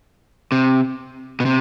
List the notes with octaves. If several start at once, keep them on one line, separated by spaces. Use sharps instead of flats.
C3
B2
C3